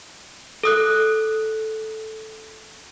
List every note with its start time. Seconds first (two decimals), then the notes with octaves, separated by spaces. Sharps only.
0.63 A4 D#6 F#6